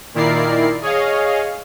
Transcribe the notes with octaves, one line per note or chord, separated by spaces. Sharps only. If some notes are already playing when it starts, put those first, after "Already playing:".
A#2 D#3 E4 A#4 D5 C7
G#4 C#5 D#5 F5